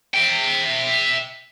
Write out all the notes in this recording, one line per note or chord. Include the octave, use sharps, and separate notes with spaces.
E5 G5